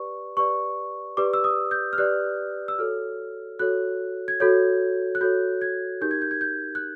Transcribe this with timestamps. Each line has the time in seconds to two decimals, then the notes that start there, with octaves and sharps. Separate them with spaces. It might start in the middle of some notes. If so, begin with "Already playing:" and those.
Already playing: G4 B4 D5 C#6
0.37 G4 B4 D5 C#6
1.17 G4 B4 D5 D6
1.34 E6
1.44 D#6
1.71 G6
1.93 F6
1.98 G4 B4 D5 F#6
2.68 E6
2.78 F#4 A4 C#5 F6
3.59 F#4 A4 C#5 F#6
4.28 G#6
4.40 F#4 A4 C#5 G6
5.15 F#6
5.21 F#4 A4 C#5 G6
5.61 G#6
6.01 D#4 G4 A#4 G6
6.11 G#6
6.22 G6
6.31 G#6
6.41 G6
6.75 F#6